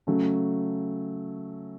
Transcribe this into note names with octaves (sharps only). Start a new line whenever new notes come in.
C#3 F#3 A3 C#4